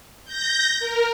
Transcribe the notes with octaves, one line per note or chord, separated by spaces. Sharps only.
G6 A#6
A#4